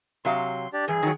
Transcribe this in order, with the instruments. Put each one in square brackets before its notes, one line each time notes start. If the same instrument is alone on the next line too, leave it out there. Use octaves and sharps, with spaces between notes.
[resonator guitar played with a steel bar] C3 F#3 F5 [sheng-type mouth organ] C6
[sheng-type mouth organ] D4 G4 D5
[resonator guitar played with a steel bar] G2 E3 [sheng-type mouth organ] G#4
[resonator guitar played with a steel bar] D#3 F#3